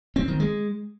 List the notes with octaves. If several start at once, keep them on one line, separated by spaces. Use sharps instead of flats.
C4
D#3
G#3